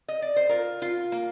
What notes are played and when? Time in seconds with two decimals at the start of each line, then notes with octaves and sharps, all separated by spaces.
0.08 D#5
0.22 D5
0.36 C5
0.49 F4 A#4
0.82 F4
1.12 A#3